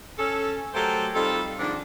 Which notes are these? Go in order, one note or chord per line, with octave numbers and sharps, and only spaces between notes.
C#4 A4
F#3 A3 G4 A4 A#4 C5
G3 C4 D#4 F4 A4
G#2 C3 D#3 F3 D4